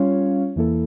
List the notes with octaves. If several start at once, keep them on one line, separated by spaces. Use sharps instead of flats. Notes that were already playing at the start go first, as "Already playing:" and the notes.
Already playing: G3 C#4 F4 C#5 F5
E2 E3 A#3 E4 A4